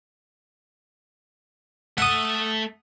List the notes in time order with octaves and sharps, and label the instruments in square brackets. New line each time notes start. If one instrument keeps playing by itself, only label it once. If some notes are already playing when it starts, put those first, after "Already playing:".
[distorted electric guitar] A3 E5 [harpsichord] F#5 D#6